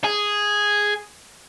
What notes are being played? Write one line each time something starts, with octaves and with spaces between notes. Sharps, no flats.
G#4